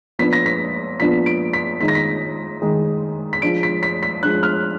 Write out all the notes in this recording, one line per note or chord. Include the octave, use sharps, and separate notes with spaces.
A#2 F3 B3 D4 B6
A#6
B6
A#2 F3 B3 D4 B6
D7
B6
D#3 G#3 D#4 B6
A#6
B6
D#3 G#3 D#4
B6
F3 G#3 D4 D7
B6
B6
B6
F3 G#3 D4 F#6
F6